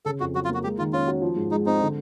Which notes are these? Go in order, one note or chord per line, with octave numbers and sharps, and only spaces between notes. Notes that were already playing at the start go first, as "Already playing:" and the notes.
C#3 A4
F2 F#4
F#3 F#4
F4
A#3 F#4
G#3 G4
D#3 F4
C#4 F4
F#4
F3
G#2
G#3 D#4
C4 D#4
D3